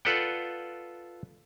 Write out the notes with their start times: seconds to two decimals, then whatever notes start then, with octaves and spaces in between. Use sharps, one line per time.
0.05 F4 A4 B4 D5 F#5 G5